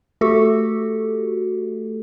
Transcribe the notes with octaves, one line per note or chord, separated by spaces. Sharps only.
A3 F#4 G4 A4